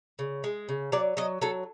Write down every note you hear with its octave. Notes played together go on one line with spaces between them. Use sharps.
C#3
G#3
C#3
F#3 D5
F#3 D#5
F#3 A4